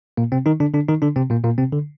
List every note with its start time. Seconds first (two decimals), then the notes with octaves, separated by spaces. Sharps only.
0.17 A#2 A#3
0.32 C3 C4
0.46 D#3 D#4
0.60 D3 D4
0.74 D3 D4
0.88 D#3 D#4
1.02 D3 D4
1.16 C3 C4
1.30 A#2 A#3
1.44 A#2 A#3
1.58 C3 C4
1.73 D3